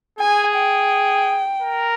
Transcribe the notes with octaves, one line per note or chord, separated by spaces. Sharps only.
G#4 G#5
G5
A#4